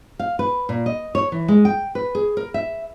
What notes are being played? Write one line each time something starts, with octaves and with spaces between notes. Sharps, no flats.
F5
B4
A#2
D#5
C#5
E3
G#3
G5
B4
G#4
A#4
E5